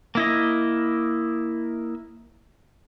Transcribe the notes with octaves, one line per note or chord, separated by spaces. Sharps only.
A#3 E4 D#5